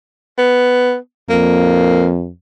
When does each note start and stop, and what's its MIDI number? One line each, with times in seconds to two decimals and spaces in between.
0.38 0.96 59
1.30 2.29 41
1.30 2.07 58